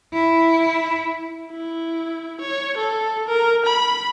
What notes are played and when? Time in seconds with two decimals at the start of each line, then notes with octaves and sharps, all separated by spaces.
0.14 E4
1.52 E4
2.41 C#5
2.77 A4
3.27 A#4
3.66 B5